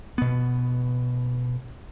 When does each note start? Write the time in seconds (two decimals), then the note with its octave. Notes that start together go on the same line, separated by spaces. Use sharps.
0.18 B2 B3